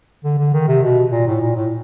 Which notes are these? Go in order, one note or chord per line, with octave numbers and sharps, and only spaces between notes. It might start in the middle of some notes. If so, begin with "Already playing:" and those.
D3
D3
D#3
C3
B2
A#2
A2
A#2
A2